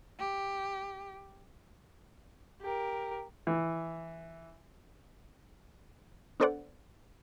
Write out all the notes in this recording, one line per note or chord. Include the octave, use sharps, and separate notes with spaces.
G4
G4 A#4
E3
B3 D4 A4 C5 D5 F#5